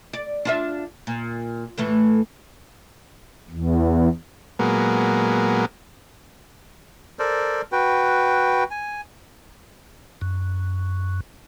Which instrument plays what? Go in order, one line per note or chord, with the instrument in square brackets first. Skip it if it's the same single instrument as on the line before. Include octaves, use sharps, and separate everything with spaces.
[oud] D5
D4 F4 E5
A#2
A2 E3 A3
[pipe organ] E2
[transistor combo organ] A#2 F#3 G#3 A#3 B3
[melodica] A4 A#4 C5 D5
F#4 B4 G5
G#5
[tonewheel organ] F#2